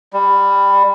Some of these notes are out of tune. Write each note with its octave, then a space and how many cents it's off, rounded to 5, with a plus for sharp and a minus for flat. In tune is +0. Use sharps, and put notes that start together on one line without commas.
G3 +20